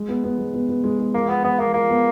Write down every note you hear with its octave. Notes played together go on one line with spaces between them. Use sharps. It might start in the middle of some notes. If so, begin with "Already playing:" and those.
Already playing: G#3
B3
B3
G#3
B3
B3
G#3
G#3
F3 A#3
F3 B3
F3 B3
F3 A#3
F3 A#3
B3